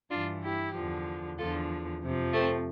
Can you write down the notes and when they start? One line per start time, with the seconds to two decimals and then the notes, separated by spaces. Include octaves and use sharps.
0.10 G2 E3 D4 F4
0.42 E4 G4
0.73 E2 D3 F3
1.37 E2 D3 F3 F4 A4
2.02 F2 C3 F3
2.33 A3 C4